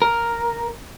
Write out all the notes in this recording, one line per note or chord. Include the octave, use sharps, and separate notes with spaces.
A#4